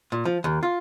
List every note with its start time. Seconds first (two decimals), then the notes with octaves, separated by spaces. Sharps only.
0.12 A#2
0.25 F3
0.44 D#2
0.63 F4